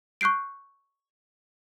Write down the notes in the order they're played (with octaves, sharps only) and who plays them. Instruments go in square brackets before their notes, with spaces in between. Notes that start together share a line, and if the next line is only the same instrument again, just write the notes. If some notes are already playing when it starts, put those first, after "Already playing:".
[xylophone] C#6 F#6 G6 C7 D7